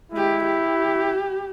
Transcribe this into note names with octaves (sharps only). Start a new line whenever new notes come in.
G#3 E4 G4
G4